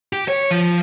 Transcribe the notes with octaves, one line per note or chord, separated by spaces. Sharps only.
G4
C#5
F3